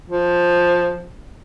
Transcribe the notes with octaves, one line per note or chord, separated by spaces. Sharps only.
F3